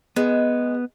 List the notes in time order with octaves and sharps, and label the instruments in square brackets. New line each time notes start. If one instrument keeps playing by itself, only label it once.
[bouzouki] G#3 [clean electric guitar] B3